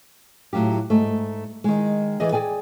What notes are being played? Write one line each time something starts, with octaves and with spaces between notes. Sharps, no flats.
A2 F#3 F4 G4
G#2 A3
D#3 G#3
E3 G#4 D5 D#5
G#4 D5 G5 G#5